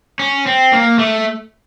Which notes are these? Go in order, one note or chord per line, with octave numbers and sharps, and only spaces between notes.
C#4
C4
A#3
A3